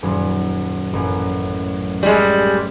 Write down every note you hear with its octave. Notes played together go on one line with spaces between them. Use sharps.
D#1 F#2
A1 F#2
G3 G#3